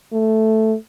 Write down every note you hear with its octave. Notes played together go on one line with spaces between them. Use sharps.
A3